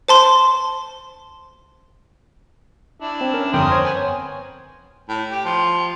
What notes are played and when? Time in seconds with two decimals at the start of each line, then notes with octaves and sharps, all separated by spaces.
0.08 C5 A5 C6
3.01 D4 E4
3.21 C4
3.34 C#4 A#4
3.53 G1 F2 A#4 G5 C6 D#6
3.70 C5 C#5 G#6
3.84 B3 B4 G#5
5.09 A2
5.31 G4
5.45 F3